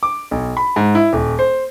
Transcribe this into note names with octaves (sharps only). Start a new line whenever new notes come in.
D6
B1
B5
G#2
E4
D#1
C5